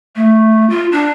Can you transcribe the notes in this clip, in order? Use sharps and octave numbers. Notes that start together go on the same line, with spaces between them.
A3
F4
D4